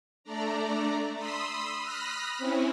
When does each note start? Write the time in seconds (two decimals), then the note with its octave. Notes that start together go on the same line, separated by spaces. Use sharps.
0.24 A3 D4 D5 A#5
1.16 B5 C6 D#6 E6
1.80 B5 D#6 F6 F#6 A#6 B6
2.38 C4 C#4 E4